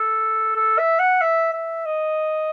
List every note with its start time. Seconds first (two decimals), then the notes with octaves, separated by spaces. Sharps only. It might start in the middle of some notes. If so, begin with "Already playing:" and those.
Already playing: A4
0.56 A4
0.78 E5
0.99 F#5
1.22 E5
1.53 E5
1.85 D#5